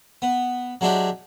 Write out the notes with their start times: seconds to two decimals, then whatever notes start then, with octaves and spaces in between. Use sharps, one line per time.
0.22 B3
0.81 F#3 G#3 D4 E4 G4